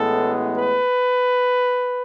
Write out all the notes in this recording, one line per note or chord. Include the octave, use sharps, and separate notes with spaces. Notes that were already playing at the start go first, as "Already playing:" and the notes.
Already playing: A1 A2 G#3 B3 A4
B4